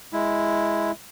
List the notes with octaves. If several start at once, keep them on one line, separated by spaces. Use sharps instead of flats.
G#3 E4